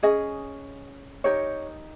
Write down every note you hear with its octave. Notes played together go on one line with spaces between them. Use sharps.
C#4 G#4 D#5
D#4 G4 A#4 C#5